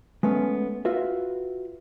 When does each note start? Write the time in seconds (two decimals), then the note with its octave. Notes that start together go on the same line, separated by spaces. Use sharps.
0.23 G#3 A3 B3 C#4
0.85 F4 F#4 B4 E5